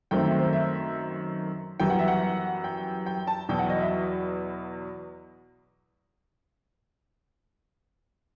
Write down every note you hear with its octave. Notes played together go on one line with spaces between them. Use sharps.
F#2 D#3 A3 C4 G5
E5
C5
E5
F#2 E3 G3 B3 G5
F#5
E5
F#5
G5
G5
A5
E2 B2 F#3 G5
F#5
D#5
E5